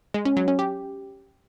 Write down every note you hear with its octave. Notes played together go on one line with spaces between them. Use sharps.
G#3
C#4
F#3
C#4
G4